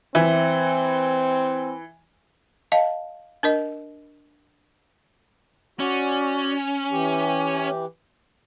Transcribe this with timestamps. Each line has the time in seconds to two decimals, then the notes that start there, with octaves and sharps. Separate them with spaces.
0.15 E3 C4 E5
2.72 D#5 F5 A5
3.43 D4 A#4 D#5
5.80 C#4 F#4 D5
6.92 E3 G4